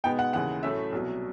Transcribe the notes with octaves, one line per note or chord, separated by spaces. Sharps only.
B2 G#3 B3 D#4 G5
F#5
D#2 C#3 E3 F#5
A2 F#3 A3 C#4 E5
C2 B2 F#3